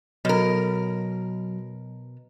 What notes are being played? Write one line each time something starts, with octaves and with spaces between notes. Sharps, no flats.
B2 F#3 A#4